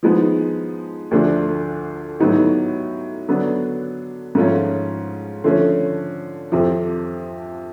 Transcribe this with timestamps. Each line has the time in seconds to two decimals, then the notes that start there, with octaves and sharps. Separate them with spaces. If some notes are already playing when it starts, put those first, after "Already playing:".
0.03 F3 G#3 B3 D#4
1.11 D2 D3 F3 A3 D4
2.20 A2 F#3 B3 D#4 G4
3.28 D3 F#3 B3 D4
4.35 G#2 F3 A3 C#4 F4
5.44 D3 F3 A3 C#4
6.52 F2 C3 F3